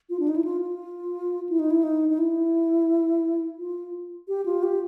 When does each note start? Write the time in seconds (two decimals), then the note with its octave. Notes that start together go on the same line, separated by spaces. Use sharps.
0.10 F4
0.19 D4
0.28 D#4
0.36 E4
0.44 F4
0.62 F4
1.49 E4
1.59 D#4
1.71 E4
1.83 D#4
2.09 D#4
2.18 E4
3.59 F4
4.28 G4
4.46 F4
4.63 G4